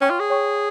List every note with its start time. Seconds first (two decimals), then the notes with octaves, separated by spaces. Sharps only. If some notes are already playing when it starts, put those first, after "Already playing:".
0.01 C#4 C#5 G5 C#6
0.10 F4
0.20 G#4
0.30 C#5 G5 C#6